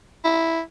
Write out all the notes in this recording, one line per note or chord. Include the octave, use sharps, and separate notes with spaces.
E4